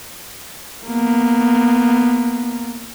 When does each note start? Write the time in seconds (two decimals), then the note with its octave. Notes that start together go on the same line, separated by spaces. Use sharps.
0.87 A#3 B3